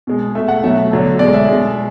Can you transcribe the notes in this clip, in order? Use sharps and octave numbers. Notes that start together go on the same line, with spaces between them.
B2 G#3
B2 A3 E5
F#5
B2 F#3 A3 E5
D3 F#3 A3
B2 G#3 D5
E5
B2 G#3